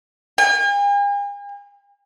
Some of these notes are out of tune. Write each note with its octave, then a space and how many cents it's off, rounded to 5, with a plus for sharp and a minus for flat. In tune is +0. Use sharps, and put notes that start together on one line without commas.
G#5 -45